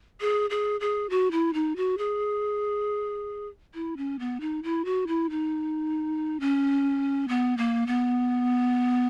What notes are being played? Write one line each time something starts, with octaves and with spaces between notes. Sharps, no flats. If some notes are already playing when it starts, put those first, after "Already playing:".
G#4
G#4
G#4
F#4
E4
D#4
F#4
G#4
E4
C#4
B3
D#4
E4
F#4
E4
D#4
C#4
B3
A#3
B3